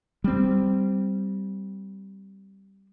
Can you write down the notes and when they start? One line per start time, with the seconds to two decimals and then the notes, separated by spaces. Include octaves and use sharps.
0.24 G3 C4